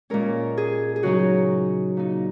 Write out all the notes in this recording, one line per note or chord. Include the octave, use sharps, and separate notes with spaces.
A#2 G#3 C#4 A#4
G#4
G#4
C#3 F#3 D#4 F#4
A#2 A#3 D#4